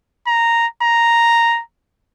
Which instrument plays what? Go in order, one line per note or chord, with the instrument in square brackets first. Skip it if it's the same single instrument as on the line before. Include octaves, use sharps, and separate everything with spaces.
[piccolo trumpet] A#5
A#5